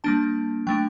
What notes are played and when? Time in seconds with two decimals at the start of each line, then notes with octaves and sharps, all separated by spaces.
0.04 G3 A#3 D4 A5
0.67 F#3 A3 D4 G5